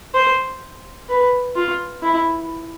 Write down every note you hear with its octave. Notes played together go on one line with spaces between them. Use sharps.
C5
B4
F4
E4